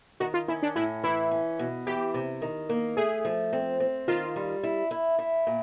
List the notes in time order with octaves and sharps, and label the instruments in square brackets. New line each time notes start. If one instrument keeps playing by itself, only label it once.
[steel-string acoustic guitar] D#3 [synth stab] F#4
[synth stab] F4
[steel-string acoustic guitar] C#4 [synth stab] E4
[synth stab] D4
[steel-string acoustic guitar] A2 [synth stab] E4
[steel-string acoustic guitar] E3 [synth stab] E4
[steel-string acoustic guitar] C#4
B2
[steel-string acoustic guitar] E3 [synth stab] G4
[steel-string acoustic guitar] C3
D#3
A#3
[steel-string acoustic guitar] A3 [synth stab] G#4
[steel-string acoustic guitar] F3
C4
C4
[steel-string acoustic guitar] D#3 [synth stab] F4
[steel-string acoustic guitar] G3
E4
E4
E4
A#2